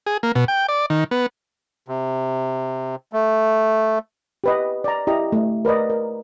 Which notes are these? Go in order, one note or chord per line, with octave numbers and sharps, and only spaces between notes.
G#4
A#3
B2
G5
D5
D#3
B3
C3
A3
G4 B4 D#5
D5 A#5
E4 G4 D#5 A#5
A3
A#4 B4 D5 D#5
A#4